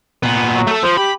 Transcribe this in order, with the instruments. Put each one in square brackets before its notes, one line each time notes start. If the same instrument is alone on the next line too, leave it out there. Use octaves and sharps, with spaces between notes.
[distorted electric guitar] A#2 B3
[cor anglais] F#3
[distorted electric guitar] A3 A4
[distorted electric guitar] F3 [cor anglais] C5
[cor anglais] G4 [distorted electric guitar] B5